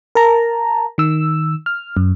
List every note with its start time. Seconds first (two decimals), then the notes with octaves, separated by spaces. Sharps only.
0.15 A#4 A5 A#5
0.98 D#3 E6
1.66 F6
1.97 F#2